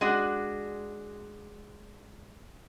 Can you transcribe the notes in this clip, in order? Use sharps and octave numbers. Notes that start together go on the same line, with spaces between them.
G#3 D4 F#4